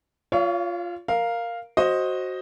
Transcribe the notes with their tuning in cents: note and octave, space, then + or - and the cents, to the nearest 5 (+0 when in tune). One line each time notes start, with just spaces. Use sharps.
F4 +0 C#5 +30 F5 -40
A#4 +0 F5 +0
F#4 +0 C5 +10 D#5 +5